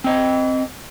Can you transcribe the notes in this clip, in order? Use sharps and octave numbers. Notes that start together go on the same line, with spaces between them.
C4 D#5